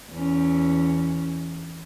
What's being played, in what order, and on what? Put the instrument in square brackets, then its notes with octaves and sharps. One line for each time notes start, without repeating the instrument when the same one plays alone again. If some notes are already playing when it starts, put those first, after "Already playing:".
[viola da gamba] E2 C#4